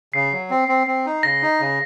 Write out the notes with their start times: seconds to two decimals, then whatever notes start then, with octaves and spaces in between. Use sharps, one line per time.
0.14 C#3 C7
0.32 F#3
0.50 C4
0.69 C4
0.87 C4
1.06 D#4
1.23 C#3 A#6
1.42 D#4
1.60 C#3